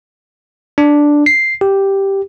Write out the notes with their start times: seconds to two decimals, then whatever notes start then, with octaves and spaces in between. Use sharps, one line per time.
0.78 D4
1.26 C7
1.61 G4